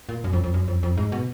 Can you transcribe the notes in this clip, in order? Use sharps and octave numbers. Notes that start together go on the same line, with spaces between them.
A#2
F#2
F2
F2
F#2
F2
F2
G#2
B2